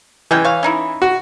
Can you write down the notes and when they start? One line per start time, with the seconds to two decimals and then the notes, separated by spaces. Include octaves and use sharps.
0.31 E3 G#3 C#4 G5
0.44 C#5 F5
0.63 C#4 D#4 E4
1.02 F#4